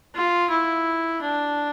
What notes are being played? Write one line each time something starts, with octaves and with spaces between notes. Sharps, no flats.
F4
E4
D4